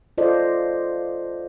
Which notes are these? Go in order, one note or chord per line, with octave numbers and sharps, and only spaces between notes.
F4 A4 C5 D5 D#5